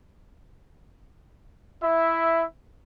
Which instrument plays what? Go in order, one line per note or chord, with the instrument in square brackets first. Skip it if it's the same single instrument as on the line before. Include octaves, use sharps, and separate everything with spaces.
[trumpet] E4 [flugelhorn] E5